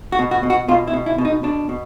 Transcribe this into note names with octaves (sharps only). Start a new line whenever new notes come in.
F#4
B2
F#4
B2
F#4
B2 F4
E4
B2
E4
B2
D#4
B2 D4
B2